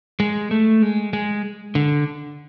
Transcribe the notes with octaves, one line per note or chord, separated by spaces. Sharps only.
G#3
A3
G#3
G#3
D3